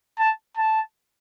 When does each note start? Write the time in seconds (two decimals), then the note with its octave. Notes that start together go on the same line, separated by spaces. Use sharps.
0.19 A5
0.57 A5